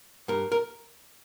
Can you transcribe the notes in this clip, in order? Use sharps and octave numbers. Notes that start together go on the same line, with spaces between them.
G2 A#4
A#4